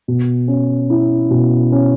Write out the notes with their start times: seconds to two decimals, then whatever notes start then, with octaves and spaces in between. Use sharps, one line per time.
0.08 B2
0.48 C#4
0.90 E4
1.30 B2
1.72 C#4